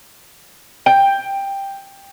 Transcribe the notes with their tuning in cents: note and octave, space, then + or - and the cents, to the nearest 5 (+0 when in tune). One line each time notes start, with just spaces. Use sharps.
G5 +10